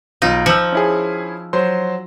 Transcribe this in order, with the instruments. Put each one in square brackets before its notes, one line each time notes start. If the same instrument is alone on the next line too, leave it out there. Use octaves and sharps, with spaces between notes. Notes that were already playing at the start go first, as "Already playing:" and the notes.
[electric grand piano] B1 F4 [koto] D#4
[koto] F3 [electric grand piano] E6 G6 C#7
[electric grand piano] C#4 E4 G#4
F#3 C5 C6